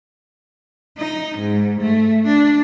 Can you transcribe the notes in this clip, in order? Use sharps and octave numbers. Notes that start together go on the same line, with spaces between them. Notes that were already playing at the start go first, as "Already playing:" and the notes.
D#4
G#2
A3
D4